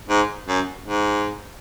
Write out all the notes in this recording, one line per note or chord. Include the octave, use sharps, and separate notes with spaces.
G#2
F#2
G#2